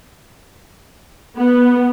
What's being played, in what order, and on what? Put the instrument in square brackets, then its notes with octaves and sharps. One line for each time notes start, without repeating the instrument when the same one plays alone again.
[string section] B3